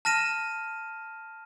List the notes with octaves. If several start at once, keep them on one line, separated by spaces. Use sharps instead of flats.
A5 F6 A#6 D#7 E7